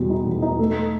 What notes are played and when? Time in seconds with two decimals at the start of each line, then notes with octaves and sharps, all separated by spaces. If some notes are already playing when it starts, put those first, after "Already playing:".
Already playing: E2 B2 G3
0.10 D#4
0.26 E2
0.42 D#4
0.59 A3